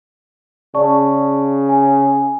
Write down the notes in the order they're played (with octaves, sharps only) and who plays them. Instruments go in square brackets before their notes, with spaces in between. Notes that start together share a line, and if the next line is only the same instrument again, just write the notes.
[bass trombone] C#3 [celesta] D5 A5 C#6
[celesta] G#5